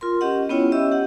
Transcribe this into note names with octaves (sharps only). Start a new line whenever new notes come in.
F4 A#4 C6
C#4 G4 D#5 F#5
B3 C#4 E4 F4 C#5 G5
C#4 G4 D#5 E5 E6
G4 F#5